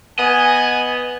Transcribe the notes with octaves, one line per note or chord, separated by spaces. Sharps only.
B3 D#5 G#5